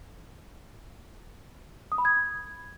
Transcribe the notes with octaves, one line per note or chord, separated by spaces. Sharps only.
D#6
B5
G#6